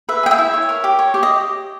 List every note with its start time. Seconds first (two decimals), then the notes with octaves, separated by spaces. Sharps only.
0.09 B4 E5
0.23 G#4 G5
0.31 E5
0.38 E4
0.54 C#5
0.69 A#4
0.84 G4
0.99 C#5
1.14 G4
1.23 D#5